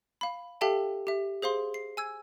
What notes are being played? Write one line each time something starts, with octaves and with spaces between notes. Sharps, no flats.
F5 B5
G4 A4 E5 F5 G5 A5
G4 E5
G#4 C5 F5 C6
C7
G#5 E6 G#6